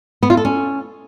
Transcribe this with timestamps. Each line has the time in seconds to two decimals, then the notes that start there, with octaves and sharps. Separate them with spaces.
0.23 B3
0.30 F4
0.37 A4
0.45 C#4